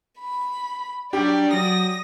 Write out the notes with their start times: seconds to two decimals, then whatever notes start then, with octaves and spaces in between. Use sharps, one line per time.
0.20 B5
1.13 F#3 G3 D4 G4 D5
1.53 F#3 D#6 A#6